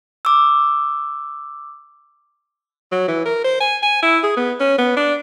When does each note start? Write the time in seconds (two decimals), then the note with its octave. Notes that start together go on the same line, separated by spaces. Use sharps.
0.25 D6 E6
2.91 F#3
3.08 E3
3.25 A#4
3.44 C5
3.60 G#5
3.82 G#5
4.02 E4
4.23 G#4
4.37 B3
4.60 C#4
4.78 B3
4.96 D4